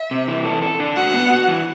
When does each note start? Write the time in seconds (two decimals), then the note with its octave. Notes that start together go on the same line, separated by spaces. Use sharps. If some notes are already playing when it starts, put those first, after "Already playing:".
Already playing: E5
0.11 C3
0.28 E3
0.45 A4
0.62 A4
0.80 D4
0.96 F#4 F#5
1.14 B3
1.30 F#4
1.48 E3